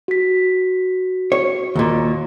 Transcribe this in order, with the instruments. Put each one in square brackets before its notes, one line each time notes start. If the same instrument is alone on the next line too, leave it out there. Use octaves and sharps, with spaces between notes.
[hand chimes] F#4 B6
[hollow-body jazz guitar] C#5
D#2 A#2